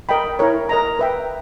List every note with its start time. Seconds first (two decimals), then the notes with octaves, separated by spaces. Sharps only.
0.09 A#4 D#5 G5 B5
0.39 E4 A#4 C#5
0.69 A#4 D#5 A#5
0.99 B4 E5 G5